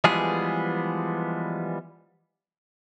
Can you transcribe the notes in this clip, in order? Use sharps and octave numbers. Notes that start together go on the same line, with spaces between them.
E3 F3 G3 G#3 B3 G#4